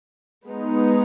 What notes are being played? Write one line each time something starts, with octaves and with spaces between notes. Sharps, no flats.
G#3 B3 D#4